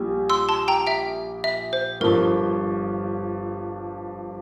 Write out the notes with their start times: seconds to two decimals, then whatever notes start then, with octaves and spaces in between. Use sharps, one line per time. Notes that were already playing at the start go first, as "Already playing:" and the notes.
Already playing: A#1 A#2 G3
0.30 C6 E6
0.49 A5 C6
0.68 G5 A#5
0.87 E5 G5
1.44 E5
1.73 C5
2.01 G1 G2 F3 A#4